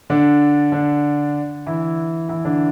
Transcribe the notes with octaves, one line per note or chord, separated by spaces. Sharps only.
D3 D4
D3 D4
E3 E4
E3 E4
D3 D4